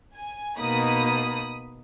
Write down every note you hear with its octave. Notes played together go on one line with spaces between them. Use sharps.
G#5
B2 A#3 D#4 B5 D#6